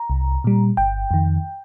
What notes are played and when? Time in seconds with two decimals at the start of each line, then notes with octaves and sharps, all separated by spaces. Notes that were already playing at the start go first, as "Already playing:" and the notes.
Already playing: A#5
0.10 C2
0.44 A#2 G3
0.77 G1 G5
1.11 F2 D#3